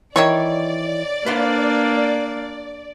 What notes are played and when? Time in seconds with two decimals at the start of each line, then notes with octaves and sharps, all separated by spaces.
0.16 D#3 E3 C#5 D5 C#6
1.26 A#3 D4 B4 C5 F5